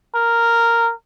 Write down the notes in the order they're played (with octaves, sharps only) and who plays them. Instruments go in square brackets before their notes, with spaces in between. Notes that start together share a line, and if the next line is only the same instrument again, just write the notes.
[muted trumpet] A#4